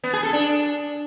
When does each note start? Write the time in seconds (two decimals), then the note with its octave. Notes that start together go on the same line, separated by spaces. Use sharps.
0.04 B3
0.13 G#4
0.23 A4
0.33 D4